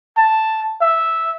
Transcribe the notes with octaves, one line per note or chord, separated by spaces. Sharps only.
A5
E5